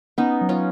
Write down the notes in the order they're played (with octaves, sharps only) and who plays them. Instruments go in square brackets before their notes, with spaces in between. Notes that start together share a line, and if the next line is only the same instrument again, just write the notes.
[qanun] B3 D#4 [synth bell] C#4
[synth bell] F#3
[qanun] C#4 F4